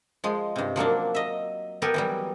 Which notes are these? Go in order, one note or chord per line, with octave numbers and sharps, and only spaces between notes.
F3 G#3
G2 C3
F3 F#3 A#3 D4
D#5 E5
B3 G4 A4 A#4 G#5
E3 F#3 G3